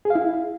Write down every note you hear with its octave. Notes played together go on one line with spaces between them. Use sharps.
G#4
F5
E4